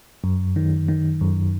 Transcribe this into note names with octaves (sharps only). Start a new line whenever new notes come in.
F#2
D#3
D#3
F#2